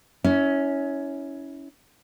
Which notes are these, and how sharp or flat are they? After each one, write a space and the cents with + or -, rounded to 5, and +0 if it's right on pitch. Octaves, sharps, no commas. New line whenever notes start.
C#4 +10 E4 -25